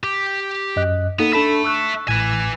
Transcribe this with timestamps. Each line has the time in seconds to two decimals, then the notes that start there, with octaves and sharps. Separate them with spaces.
0.04 G4
0.76 F#2 D#5 F#6
1.19 A#3 B3 D#4 A4
1.33 D4 A4 E5 A5 B5
1.64 C#6 E6 F#6
2.08 A1 A2 B4 G#5 G#6